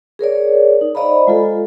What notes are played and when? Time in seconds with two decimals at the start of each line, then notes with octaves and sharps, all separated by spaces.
0.19 G#4 A#4 C#5 D5
0.81 D#4
0.95 C5 D5 D#5 F5 A#5 B5
1.27 G#3 F4 A4